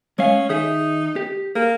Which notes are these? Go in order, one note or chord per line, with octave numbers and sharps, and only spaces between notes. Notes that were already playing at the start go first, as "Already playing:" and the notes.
G#3 C#4 F5
D#3 D#4 G#4 E5
G4
A#3 G#4